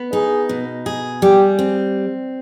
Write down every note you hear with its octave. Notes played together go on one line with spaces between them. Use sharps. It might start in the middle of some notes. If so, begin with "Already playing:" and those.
Already playing: B3
D#4 G#4
B2
G#4
G3 G4
C4